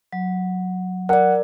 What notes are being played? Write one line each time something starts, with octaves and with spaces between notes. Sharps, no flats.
F#3
A#4 D5 F#5